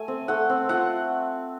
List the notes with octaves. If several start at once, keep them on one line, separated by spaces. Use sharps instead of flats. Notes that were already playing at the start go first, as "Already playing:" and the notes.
Already playing: A3 G#5
C4
A3 F#5
C4
F4 F#5